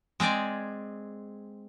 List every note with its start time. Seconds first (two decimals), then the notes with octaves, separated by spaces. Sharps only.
0.20 G#3 C4 G#4 D5